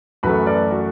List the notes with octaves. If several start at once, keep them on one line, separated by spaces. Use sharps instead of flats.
F#2 E3 A3 F#4 B4
A4 D5
F#4